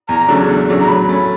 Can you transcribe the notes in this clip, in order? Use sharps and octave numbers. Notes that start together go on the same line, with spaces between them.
E2 A#5
C#3 F#3 A3 D4
E2
C#3 F#3 A3 D4
A#5
F#3 B5
A3 C#4